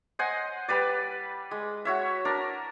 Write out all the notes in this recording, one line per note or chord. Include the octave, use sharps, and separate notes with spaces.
C5 D#5 F#5 G#5
G3 B4 D5
G#3
F#4 C#5 E5
D4 A#4